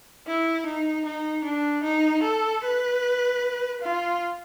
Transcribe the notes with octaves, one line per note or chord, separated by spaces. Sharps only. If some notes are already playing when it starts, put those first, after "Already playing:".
E4
D#4
D#4
D4
D#4
A4
B4
F4